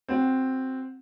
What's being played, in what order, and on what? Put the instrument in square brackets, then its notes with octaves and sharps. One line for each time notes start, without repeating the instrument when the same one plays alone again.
[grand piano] C4 F#4